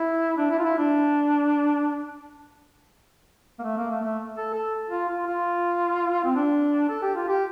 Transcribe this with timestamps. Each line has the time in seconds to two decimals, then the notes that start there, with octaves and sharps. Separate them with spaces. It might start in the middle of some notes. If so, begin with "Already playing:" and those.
Already playing: E4
0.37 D4
0.50 E4
0.59 F4
0.64 E4
0.78 D4
3.59 A#3
3.63 A3
3.77 A#3
3.91 A3
4.04 A3
4.36 A4
4.54 A4
4.90 F4
5.08 F4
5.26 F4
6.24 C4
6.36 D4
6.89 A4
7.02 G4
7.15 F4
7.28 G4